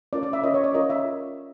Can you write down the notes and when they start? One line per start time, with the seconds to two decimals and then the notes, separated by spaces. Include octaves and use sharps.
0.13 C#4 F4 A#4 C#5 D5
0.23 D5
0.33 E5
0.43 C#4 F4 A#4 C#5 D#5
0.54 C#5
0.64 D5
0.74 C#4 F4 A#4 C#5 D#5
0.90 E5